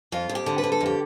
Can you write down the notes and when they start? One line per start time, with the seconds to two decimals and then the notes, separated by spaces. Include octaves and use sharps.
0.12 F2 F4
0.29 F2
0.35 G4
0.46 D3
0.58 B4
0.64 D3
0.72 A4
0.80 F2
0.86 G4